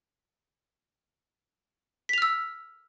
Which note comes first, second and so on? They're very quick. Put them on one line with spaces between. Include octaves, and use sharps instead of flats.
B6 F7 F6 E6